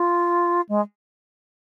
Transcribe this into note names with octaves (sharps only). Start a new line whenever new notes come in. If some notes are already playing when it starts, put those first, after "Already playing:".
Already playing: F4
G#3